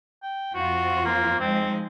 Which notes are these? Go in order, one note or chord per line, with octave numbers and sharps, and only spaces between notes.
G5
F2 C4 F4 F#4
A#3
F3 G#3 C4 D#4